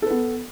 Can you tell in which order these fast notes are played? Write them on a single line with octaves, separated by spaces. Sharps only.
A4 B4 B3